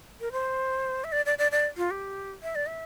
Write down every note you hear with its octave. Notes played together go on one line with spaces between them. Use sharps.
A#4
C5
E5
D5
D5
D5
D5
F4
G4
E5
D5
E5